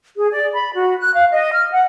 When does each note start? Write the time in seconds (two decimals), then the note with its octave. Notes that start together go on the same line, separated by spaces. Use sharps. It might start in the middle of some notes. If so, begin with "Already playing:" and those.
0.16 G#4
0.32 D5
0.53 B5
0.74 F#4
0.99 F#6
1.14 F5
1.31 D#5
1.52 F6
1.72 F#5